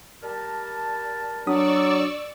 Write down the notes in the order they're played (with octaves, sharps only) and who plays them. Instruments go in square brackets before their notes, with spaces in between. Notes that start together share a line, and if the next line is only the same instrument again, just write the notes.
[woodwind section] G3 A#4 A5
[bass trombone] F#3 [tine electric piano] D4 D#6 [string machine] D5 C#6 E6